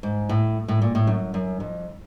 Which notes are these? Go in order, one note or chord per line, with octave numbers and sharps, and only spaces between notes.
G#2
A2
A2
A#2
A2
F#2
F#2
F2